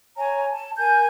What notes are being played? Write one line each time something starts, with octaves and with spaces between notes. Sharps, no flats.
C#5 G#5 A#5
A5
A#4 G#5 G6